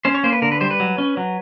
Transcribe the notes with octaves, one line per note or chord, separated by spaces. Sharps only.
C#4 C5
C#5
A#3 C5
B4
D3 A#4
B4
G3 C5
B4
F#3
C#4
F#3